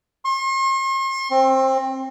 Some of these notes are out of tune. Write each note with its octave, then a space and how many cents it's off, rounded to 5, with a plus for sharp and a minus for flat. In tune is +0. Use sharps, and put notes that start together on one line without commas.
C6 +45
C4 +20